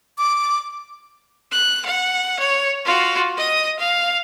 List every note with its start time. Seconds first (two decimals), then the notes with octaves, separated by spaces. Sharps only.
0.18 D6
1.52 F#6
1.86 F#5
2.40 C#5
2.86 F4 F#4
3.37 D#5 D#6
3.80 F5